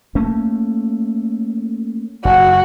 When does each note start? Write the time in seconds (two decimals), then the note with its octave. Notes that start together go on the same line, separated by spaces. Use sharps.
0.15 A3 A#3 C#4
2.25 F#1 F#4